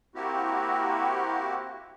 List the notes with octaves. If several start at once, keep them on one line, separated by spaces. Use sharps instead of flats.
A#3 C4 E4 F#4 G4